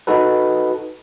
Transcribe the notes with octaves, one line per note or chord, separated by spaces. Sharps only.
D#4 F#4 A4 B4